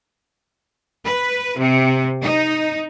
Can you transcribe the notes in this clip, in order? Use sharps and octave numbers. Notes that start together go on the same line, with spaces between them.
B4
C3
D#4